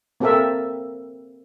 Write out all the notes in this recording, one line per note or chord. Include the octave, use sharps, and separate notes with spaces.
A#3 C4 G4 A4 A#4 E5